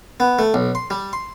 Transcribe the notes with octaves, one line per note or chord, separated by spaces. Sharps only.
B3
A3
B1
C6
G3
C6